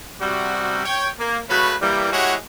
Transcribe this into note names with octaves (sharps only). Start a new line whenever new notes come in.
C3 G3 F#4
C#5 G5
A#3
C#3 A3 C#4 F#4 B4 B5
E3 G3 A#3
G#3 E4 F#4 G4 C#5 F#5